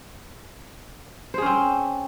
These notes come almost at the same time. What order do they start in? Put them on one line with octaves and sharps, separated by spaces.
C5 G#4 C#4 C4